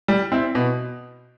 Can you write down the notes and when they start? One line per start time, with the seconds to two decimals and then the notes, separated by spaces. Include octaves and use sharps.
0.08 G3
0.32 C4 E4
0.55 B2